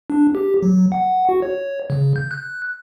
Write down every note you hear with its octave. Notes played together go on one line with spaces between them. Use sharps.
D4
G4
F#3
F#5
F#4
C#5
C#3
G6
F#6